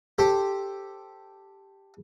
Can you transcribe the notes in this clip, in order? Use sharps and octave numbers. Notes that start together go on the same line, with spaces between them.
G4 A4 C5 G5